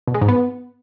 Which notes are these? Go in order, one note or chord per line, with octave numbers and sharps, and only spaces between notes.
B2
G#3
G#2
B3